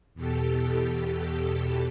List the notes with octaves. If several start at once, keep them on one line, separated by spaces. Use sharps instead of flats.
E2 B2 G4 A4